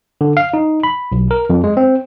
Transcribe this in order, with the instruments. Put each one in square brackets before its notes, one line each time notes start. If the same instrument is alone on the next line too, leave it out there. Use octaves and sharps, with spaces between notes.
[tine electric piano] D3
F5
D#4
B5
B1
A#4
F2
G#3
C4